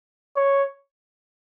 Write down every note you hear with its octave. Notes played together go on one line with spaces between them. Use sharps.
C#5